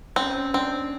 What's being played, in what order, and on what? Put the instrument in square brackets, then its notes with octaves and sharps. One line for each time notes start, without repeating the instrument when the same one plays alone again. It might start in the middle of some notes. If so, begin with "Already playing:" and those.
[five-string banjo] C4 [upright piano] C#4
[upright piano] C#4
[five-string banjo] C4 [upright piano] D4
[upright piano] C#4